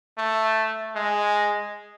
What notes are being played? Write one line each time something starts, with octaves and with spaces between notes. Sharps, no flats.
A3
G#3